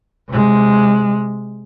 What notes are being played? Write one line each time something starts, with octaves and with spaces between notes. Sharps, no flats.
C3 G#3